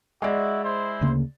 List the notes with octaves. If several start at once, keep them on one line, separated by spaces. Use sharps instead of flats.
G#3 E4 F#4 G#4 D5 E5
E4 C5
D2 C#3 A#3